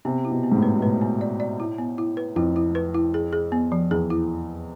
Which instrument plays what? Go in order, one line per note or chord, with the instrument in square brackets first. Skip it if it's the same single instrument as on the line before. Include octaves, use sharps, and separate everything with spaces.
[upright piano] C3 [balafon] B3
[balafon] E4
[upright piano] B2
[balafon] B3
[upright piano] G#2
A2
[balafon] B4
[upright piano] B2
[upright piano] A2 [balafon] B4
[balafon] B3
D5
D5
E4
B3
E4
B4
[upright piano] F2 [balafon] E4
[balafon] E4
B4
E4
G#4
G#4
B3
F3
[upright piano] E2 [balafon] G#4
[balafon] E4